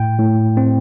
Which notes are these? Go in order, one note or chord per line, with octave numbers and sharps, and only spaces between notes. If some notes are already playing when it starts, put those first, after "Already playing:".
Already playing: A2 G5
A2
C4